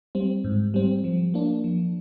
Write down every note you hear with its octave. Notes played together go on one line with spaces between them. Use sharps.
G3 C4
G#2
G3 C4
F3
A#3 D4
F3